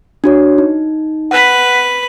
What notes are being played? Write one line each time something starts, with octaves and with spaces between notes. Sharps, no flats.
D4 F#4 C#5
D#4
B4 F#5 B5 F#6